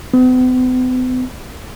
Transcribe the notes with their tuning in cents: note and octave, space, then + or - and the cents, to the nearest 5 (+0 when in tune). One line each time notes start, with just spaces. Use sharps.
B3 +45